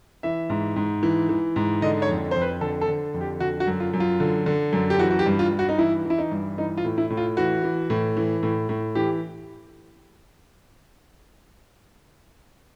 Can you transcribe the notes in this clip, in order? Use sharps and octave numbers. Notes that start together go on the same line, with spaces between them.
E3 E5
G#2
G#2
E3
E3
G#2
D3 D#5
C#5
F2
F2 C5
B4
D3 A4
A4
D3
F2
G4
D3 F#4
F#4
F#2
F4
F#2
F4
D3
D3
F#2
G4
E3 F#4
F#4
G4
G2
F4
G2
F#4
D#4
E3 E4
E3
E4
D#4
G2
E3 D#4
F4
A2
E4
A2
F4
E3 F#4
E3
A2
E3
A2
A2
E3 G4